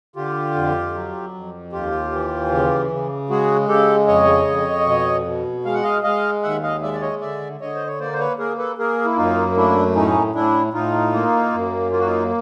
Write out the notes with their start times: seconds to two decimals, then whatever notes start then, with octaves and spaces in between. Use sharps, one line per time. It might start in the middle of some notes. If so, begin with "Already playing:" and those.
0.16 D3 F4 G4
0.55 F2
0.94 F#3
1.34 F2
1.72 D#2 F4 G4
2.12 E3
2.51 C#3
2.91 C#3
3.30 G#3 F#4 G#4
3.68 C#3 G4 A4
4.07 F2 C#5 D#5
4.47 F2
4.86 B2
5.26 B2
5.65 G#3 F5
5.75 F#5
5.83 D#5 F5
6.03 G#3 D#5 F5
6.43 D#2 E5 F#5
6.63 D#5 F5
6.82 G#3 D5 E5
6.93 D5
7.01 C#5 D#5
7.21 D3 D5 E5
7.60 D3 C#5 D#5
7.75 C5
7.87 C#5
8.00 A#3 C5 D5
8.13 C5
8.19 B4 C#5
8.39 A#3 G#4 A#4
8.58 A4 B4
8.78 A#3 G#4 A#4
9.05 E4
9.17 F#2 D#4 F4
9.57 A3 D4 E4
9.95 A2 C#4 D#4
10.35 A2 D4 E4
10.73 A2 D#4 F4
11.13 A#3
11.53 F#2
11.92 A#3 F4
12.00 F#4
12.06 D#4 F4